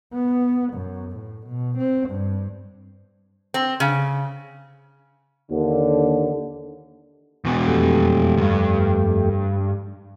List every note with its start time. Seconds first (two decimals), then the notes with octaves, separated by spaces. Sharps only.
0.13 B3
0.73 F#2
1.12 A2
1.47 B2
1.78 C4
2.10 G2
3.54 C4
3.80 C#3
5.51 D#2 D3
7.44 E2 B2
7.68 F2 A3 G4
8.37 D2 G2